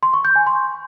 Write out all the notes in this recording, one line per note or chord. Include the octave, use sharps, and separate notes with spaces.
C6
C#6
G6
G#5
C6